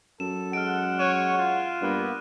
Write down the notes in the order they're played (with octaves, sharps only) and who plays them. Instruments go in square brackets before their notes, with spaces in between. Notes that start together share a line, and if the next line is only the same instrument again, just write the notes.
[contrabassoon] F#2 [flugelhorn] A4 [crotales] E7
[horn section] G#3 F#5 [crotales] F6 D7
[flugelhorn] C#5 [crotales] F#6 D#7 E7
[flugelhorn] F4
[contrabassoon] G2 [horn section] A#3 B3